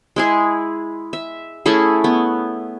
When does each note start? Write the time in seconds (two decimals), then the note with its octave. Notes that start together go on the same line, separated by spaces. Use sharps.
0.16 G#3 E4 G#4
1.13 E5
1.66 A3 C#4 E4 G#4
2.04 B3